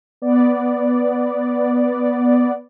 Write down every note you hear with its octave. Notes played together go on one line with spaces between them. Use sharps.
B3 D5